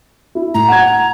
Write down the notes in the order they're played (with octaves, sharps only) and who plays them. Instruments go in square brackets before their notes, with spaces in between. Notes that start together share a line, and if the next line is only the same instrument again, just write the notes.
[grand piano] E4
[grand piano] A2 [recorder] A#5
[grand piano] F#5 G#6